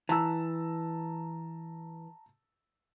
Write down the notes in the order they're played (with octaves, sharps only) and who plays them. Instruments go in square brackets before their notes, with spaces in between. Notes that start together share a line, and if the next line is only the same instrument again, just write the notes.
[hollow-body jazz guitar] E3 [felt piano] A5 A#5 E6